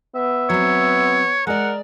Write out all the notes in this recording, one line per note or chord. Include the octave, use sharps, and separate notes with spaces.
B3 E5
F#3 C4 C#5
G#3 A#4 D5 F#5